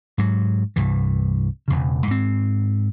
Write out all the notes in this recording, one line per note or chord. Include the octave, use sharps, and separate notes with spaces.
G#2 F#3
C2 G2 E3
E1 E2 C#3
G#2 C4